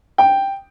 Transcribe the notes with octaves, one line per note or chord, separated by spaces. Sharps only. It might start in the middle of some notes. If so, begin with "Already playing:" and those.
G5